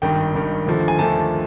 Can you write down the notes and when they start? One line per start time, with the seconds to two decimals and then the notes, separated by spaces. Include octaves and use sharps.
0.02 G#1 G2 D#3 G5
0.35 G#1 G2 D#3
0.66 D#2 D3 F3 A3
0.88 G#5
0.99 D#2 D3 F3 A3 A5